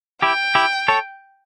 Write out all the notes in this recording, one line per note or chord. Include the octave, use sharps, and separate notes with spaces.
E4 G4 G5
E4 G4
A4 C#5